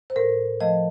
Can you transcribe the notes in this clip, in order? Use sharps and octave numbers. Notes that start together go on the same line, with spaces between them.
C5
A2 A#4
F3 A3 D#5